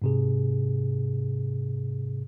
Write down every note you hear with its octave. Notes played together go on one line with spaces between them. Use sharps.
G#2 C3 G#4